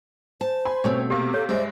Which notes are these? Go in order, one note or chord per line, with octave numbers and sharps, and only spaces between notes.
C5 A5
G#5 B5 C6
B2 A3 C4 C#4 G4 C#5
C3 A#3 G4
A4 C#5
G2 G#3 C5 D5 E5